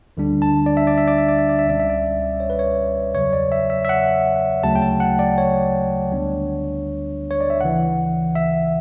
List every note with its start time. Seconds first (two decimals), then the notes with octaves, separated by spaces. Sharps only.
0.17 D2 D3 G3 D4
0.42 A5
0.66 D5
0.77 E5
0.87 D5
0.98 E5
1.08 D5
1.18 E5
1.28 D5
1.38 E5
1.49 D5
1.59 E5
1.66 C#2 B2 G3 C#4 D5
1.80 E5
1.90 D5
2.40 C#5
2.50 B4
2.59 C#5
3.14 E2 C#3 F#3 C#5
3.33 D5
3.52 E5
3.70 E5
3.85 E5
3.89 F#5
4.63 D2 C#3 F#3 A3 A5
4.75 G5
4.82 A5
5.00 F#5
5.19 D5
5.38 C#5
6.12 D2 D3 G3 B3 D4
7.31 C#5
7.41 D5
7.50 E5
7.61 D2 C#3 E3 F#5
8.35 E5